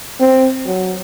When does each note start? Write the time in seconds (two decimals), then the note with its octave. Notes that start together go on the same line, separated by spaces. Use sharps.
0.20 C4
0.66 F#3